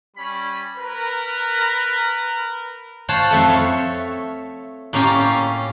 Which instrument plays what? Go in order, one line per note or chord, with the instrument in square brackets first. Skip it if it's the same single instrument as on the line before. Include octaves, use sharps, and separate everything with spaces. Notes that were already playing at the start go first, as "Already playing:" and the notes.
[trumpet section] G3 C#4 B5
A#4 B4
[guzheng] F4 C5 C#5 F#5 A5
F2 A3 A4
A4 C#5 E5
A2 A#3 C#4 F4 G4